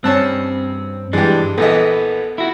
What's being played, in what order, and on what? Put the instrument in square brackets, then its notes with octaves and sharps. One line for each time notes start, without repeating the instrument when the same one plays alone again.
[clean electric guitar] G2 C4 [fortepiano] C#4 A5 F#6
[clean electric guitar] G2 E3 D4 [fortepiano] G#3 G4
[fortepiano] A#1 E3 D#5 [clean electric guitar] B3 [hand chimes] A4
[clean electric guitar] E4 F#4